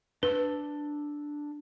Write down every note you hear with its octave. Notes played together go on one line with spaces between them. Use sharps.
D4 B4 E6